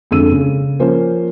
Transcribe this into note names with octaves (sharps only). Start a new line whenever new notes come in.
F2 D3 G#3 D4 E6 D#7
C#3
F3 A#3 C#4 F4 C5